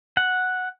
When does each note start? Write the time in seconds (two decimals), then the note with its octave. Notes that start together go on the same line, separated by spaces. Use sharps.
0.17 F#5